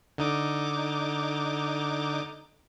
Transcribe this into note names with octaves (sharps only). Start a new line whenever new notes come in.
D3 D#4 D6